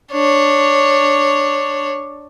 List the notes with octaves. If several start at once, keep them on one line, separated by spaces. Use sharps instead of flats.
D4 C#5